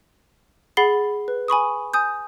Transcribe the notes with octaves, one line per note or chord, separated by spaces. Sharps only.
G#4 F#5 B5 A6 C7 G7
B4
G#5 B5 C#6 D#6
G#5 D#6 G6